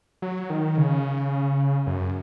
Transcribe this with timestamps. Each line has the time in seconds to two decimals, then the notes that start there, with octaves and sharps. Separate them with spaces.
0.22 F#3
0.50 D#3
0.77 C#3
1.87 F#2